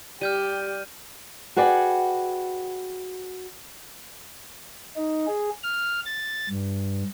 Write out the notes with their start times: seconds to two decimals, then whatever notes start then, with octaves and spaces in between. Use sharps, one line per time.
0.21 G3 G4 F6 G6 D#7
1.56 F#4 G#4 B4 D5 F#5 G5
4.96 D#4
5.27 G#4
5.64 F6
6.06 A6
6.50 G2